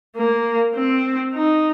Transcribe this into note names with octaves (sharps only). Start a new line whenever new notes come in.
A#3
C4
D#4